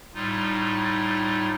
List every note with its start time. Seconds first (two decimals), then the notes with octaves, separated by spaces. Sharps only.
0.14 A2 G3 D#4 F4